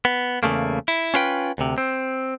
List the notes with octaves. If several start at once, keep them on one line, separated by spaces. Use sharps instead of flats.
B3
E2 C#3 A3 A#3
E4
C#4 F4 B4 G5
D2 C3
C4